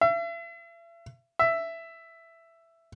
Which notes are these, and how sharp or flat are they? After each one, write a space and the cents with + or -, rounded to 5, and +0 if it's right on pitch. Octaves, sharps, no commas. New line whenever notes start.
E5 +40
E5 +10